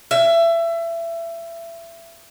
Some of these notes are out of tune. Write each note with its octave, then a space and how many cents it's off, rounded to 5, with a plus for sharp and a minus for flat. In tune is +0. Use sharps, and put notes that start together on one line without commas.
E5 +25